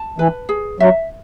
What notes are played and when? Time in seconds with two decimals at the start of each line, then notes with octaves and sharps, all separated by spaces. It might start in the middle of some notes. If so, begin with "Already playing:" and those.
Already playing: A5
0.19 E3 B4
0.49 G#4
0.80 F#3 E5